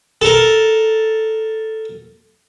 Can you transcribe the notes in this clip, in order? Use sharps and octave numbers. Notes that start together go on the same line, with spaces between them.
A4 A#4